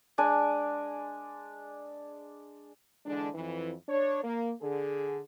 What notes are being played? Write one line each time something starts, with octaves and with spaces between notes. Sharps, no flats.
G#3 D4 G#5 D6
D3 E3 G#3 D4
F2 E3
D4 C#5
A#3
D3 G#4